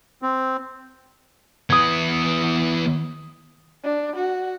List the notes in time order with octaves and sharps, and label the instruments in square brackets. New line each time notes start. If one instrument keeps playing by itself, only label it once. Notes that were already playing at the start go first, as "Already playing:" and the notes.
[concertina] C4
[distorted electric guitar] E3 B3 [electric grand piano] D#6 G#6
[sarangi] D4
F#4